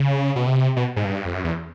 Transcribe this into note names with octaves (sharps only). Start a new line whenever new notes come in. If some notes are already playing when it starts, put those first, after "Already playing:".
Already playing: C#3
B2
C3
B2
G#2
G2
F2
F#2
E2